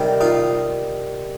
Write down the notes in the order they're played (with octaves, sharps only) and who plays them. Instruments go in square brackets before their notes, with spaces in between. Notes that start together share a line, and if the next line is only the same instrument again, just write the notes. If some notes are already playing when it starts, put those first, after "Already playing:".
Already playing: [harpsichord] C3 D#3 G3
D#4 F4